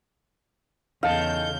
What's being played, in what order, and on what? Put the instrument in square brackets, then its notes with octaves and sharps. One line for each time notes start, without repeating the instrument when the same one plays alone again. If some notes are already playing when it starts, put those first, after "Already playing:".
[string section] E2 C#3 G6 [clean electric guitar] D#4 A4 [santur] F5